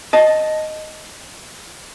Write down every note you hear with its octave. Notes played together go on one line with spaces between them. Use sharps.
D#5 A5